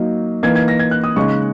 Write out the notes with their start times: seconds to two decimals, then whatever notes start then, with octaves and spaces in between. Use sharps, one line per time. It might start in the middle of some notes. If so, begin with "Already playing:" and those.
Already playing: F#3 A#3 D#4
0.43 E3 A#3 D#4 G#6
0.56 G#6
0.68 A#6
0.79 G#6
0.91 F#6
1.04 D#6
1.16 C#3 G#3 D#4 C#6